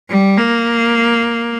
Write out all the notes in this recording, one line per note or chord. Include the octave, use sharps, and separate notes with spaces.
G3
A#3